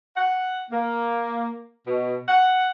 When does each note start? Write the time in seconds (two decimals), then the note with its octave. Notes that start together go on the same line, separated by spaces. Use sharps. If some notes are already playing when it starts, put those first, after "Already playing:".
0.15 F#5
0.71 A#3
1.86 B2
2.28 F#5